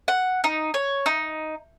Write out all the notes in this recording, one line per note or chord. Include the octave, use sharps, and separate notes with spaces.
F#5
D#4
C#5
D#4